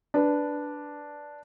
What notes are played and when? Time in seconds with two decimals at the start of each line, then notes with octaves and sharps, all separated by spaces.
0.14 D4 B4